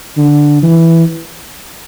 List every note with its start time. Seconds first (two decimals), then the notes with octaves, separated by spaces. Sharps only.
0.17 D3
0.63 E3